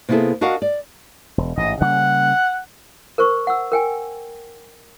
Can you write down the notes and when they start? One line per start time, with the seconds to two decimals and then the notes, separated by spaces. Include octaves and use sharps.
0.09 C3 A#3 B3 E4 G#4 A4
0.41 D4 F#4 A#4 D#5 F5 F#5
0.62 D5
1.38 E1
1.57 A1 G#2 E3 D#5
1.81 C#3 G3 A#3 F#5
3.18 A#4 C5 C#6
3.47 F#5 E6
3.72 A#4 G5 G#5